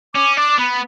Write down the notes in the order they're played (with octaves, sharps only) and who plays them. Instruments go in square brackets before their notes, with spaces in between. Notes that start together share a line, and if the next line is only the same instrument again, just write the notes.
[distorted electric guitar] C#4 [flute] D6
[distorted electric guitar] D4 [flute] D6
[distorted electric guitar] B3 [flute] B5